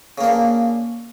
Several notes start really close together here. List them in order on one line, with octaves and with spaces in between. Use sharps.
C#3 A#3 D4